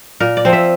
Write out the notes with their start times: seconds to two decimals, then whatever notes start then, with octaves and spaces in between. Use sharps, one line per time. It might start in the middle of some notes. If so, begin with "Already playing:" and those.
0.20 A#2 A#4
0.37 D5
0.45 F3 C4
0.53 E5